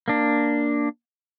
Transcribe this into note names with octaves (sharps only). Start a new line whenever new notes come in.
A#3 D4